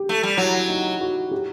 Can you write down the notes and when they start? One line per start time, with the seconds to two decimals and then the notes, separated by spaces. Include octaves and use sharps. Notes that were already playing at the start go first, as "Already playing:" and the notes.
Already playing: G4
0.09 A3
0.23 G3
0.37 F#3 E4
0.69 D#4
1.01 F#4
1.31 G4